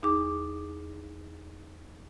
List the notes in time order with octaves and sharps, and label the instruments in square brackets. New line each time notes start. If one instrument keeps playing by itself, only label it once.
[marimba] E2 D#4 G#4 D6